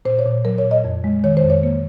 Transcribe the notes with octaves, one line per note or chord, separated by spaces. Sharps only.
A#2 C5
C#5
A#2
F#3 A#4
C#5
A#2
D#5
F2
G#3
D#3 C#5
C5
F2
C#5
A#3